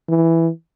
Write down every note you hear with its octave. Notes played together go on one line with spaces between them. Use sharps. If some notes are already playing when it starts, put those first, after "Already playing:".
E3